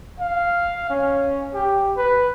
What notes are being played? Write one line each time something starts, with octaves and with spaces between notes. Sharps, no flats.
F5
C#4
G4
B4